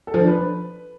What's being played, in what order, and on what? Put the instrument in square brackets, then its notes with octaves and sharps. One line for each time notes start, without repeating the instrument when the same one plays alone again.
[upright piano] A4
F3
D4
B4